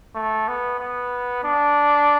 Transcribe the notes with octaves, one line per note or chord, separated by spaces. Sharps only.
A3
B3
B3
D4